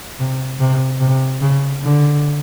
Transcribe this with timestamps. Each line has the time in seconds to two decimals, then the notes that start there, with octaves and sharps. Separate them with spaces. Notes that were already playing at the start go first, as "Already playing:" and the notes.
0.19 C3
0.60 C3
1.00 C3
1.41 C#3
1.83 D3